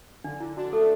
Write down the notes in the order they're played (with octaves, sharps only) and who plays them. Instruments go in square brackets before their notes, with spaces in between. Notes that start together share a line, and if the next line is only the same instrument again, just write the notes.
[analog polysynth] D3 [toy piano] D4
[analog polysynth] D3 [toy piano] E4
[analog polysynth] D4 [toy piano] F#4
[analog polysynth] A3 [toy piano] A4